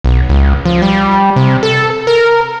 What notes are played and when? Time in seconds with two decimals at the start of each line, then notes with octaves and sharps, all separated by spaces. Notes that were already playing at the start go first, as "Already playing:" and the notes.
0.04 B1
0.29 C#2
0.65 F3
0.82 G3
1.36 C3
1.63 A4
2.07 A#4